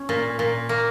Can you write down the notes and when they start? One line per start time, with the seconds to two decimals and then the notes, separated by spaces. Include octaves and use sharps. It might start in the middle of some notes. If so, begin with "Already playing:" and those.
Already playing: C#4
0.09 A#2
0.39 A#2
0.69 A#3